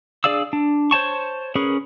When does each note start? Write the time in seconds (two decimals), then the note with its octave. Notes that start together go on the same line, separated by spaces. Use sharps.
0.24 D4 G#4 D5 F5 E6
0.53 D4
0.91 C5 C#5 A5 C#6
1.55 C#4 G#4 A#4 B4